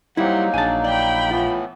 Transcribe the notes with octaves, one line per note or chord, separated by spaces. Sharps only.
F#3 G3 A#3 C4 D#4 E4 F#5
A#1 D4 G#4 G#5 A5
D5 G5 B5
A2 E3 B3 F4